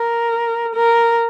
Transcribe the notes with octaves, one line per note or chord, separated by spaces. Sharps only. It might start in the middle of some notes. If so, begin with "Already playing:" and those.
Already playing: A#4
A#4